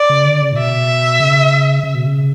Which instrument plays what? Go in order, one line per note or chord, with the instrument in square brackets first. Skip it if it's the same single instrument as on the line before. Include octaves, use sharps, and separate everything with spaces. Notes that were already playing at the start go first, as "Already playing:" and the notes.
Already playing: [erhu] D5
[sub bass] C#3
D3
C#3
A2
[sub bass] B2 [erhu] E5
[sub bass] C#3
C#3
B2
C#3